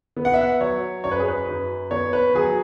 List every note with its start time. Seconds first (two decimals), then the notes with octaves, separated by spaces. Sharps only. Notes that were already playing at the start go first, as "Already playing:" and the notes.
0.17 B3
0.25 F#5
0.34 E5
0.41 F#5
0.60 F#3 C#5
1.04 F#2 C#5
1.11 B4
1.20 G#4
1.28 B4
1.48 F#2
1.91 B3 C#5
2.13 B4
2.35 F#3 G#4